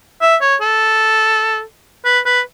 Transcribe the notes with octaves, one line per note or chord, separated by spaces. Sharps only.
E5
C#5
A4
B4
B4